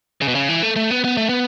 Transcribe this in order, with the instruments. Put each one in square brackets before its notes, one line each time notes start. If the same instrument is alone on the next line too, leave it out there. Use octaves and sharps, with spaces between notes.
[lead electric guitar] C#3
B2
C#3
E3
A3
A3
B3
B3
A3
B3